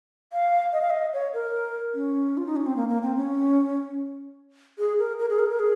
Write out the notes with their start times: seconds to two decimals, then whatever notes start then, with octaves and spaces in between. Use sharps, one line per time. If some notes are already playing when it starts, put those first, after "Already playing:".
0.33 F5
0.73 D#5
0.82 F5
0.90 D#5
1.13 C#5
1.34 A#4
1.94 C#4
2.37 F4
2.46 D#4
2.56 C#4
2.66 C4
2.76 A#3
2.89 A#3
3.03 C4
3.17 C#4
4.79 G#4
4.99 A#4
5.19 A#4
5.30 G#4
5.39 A#4
5.49 A#4
5.59 G#4